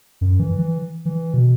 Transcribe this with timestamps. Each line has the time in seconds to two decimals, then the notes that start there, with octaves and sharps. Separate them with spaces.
0.21 F#2
0.40 E3
0.58 E3
1.05 E3
1.34 B2